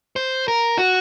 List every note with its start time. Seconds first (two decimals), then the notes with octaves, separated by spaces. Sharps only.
0.16 C5
0.48 A#4
0.79 F#4